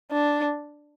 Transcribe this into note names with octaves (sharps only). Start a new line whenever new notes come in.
D4